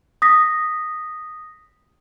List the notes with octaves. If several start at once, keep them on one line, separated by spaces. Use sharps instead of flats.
D#6 A#6 B6